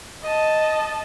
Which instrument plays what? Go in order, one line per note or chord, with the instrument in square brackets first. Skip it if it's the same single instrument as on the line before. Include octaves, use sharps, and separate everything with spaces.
[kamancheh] D#5 A5